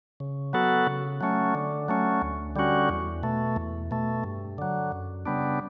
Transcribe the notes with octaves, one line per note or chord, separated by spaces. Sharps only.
C#3
F#3 B3 F#4 A4
C#3
F#3 A3 C#4
D3
F#3 A3 C#4
D2
D3 G3 C#4 F#4
E2
B2 A3
E2
B2 A3
G2
D3 F#3
F#2
C#3 G3 B3 D4